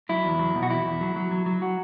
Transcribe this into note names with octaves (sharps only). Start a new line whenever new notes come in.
F#3 E4
E2
F#3
B2
F#4
E2 E4
E2
F#3
F#3
F#3
F#3
F#4